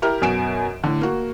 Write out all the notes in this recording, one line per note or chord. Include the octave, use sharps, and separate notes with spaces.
E4 G4 A#4
F#2 B2 G#5 D7 E7
A2 D3
A#3 F#4